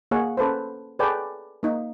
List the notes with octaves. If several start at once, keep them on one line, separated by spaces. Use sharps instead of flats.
A#3 G#4 C#5 F#5
C#4 A4 B4 C5
G#4 A4 B4 C#5 D5 G5
A#3 D#4